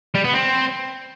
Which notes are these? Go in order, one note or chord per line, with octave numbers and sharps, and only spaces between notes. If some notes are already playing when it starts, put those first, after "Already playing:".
G3
B3
C4